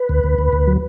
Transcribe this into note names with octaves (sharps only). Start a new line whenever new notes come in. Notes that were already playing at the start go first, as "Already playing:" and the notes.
Already playing: B4
D2
D2
D2
D2
F#3